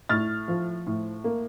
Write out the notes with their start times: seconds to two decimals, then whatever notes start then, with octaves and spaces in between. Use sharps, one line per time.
0.09 A2 F6 A6
0.48 F3
0.87 A2
1.24 A#3